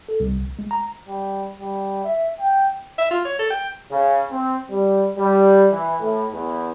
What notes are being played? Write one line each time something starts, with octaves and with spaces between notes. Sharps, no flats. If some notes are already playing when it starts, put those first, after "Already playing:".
A4
C2
A#1
G#3
A#5
G3
G3
E5
G5
E5
F4
C#5
A4
G5
C#3
C4
G3
G3
E3
A2
E2